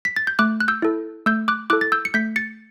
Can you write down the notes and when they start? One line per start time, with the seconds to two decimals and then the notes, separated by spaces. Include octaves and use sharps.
0.05 B6
0.16 A6
0.27 G6
0.39 A3 D6 F#6
0.60 F#6
0.68 E6 G6
0.82 E4 A4
1.26 A3 E6 G6
1.48 D6 F#6
1.70 E4 A4 D6 F#6
1.81 A6
1.92 E6 G6
2.05 C#7
2.14 A3 G6 B6
2.36 A6 C#7